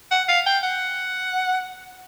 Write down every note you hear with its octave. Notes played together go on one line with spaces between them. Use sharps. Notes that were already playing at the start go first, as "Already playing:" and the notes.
F#5
F5
G5
F#5